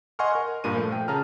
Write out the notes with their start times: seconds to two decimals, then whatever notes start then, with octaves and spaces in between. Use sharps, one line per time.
0.19 D#5 F#5 G#5 C6 C#6 F6
0.35 A#4
0.64 G2 A#2 A#4 D#7
0.76 F3 A3
0.92 G5
1.08 C#3 A5 A#5 F6